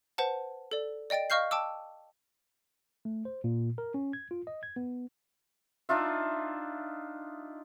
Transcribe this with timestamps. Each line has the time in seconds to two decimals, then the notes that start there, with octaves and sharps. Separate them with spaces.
0.18 B4 C5 F#5 A5
0.71 A4 D5
1.10 D5 D#5 G5 A6 D7
1.30 D#5 F5 C#6 F6 G6 C7
1.51 G5 A5 D6 E6
3.05 A3
3.25 C5
3.44 A#2
3.78 A#4
3.94 C#4
4.13 G#6
4.31 F4
4.47 D#5
4.63 G#6
4.76 B3
5.89 D4 D#4 F4 E5